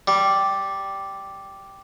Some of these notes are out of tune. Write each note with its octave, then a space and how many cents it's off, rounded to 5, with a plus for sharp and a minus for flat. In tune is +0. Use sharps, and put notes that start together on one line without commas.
G3 -5